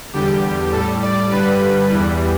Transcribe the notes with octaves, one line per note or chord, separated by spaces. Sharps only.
E2 D3 G3 G4
A2 G3 A4
D5
G2 D3 G3 B4
E2 E3 G3